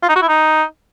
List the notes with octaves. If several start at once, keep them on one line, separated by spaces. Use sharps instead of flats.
F4
D#4
F#4
E4
D#4